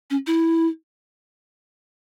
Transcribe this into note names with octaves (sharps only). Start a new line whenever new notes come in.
C#4
E4